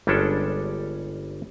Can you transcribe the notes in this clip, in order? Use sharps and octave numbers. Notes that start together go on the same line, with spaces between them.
G1 G3 G#3 C#4 D4 A4